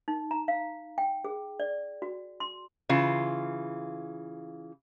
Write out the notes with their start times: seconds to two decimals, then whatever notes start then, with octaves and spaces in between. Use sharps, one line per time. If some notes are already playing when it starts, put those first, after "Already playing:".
0.08 D#4
0.31 A#5
0.48 F5
0.98 G5
1.24 G#4
1.60 D5
2.02 F#4
2.40 C6
2.89 C#3 E3 F4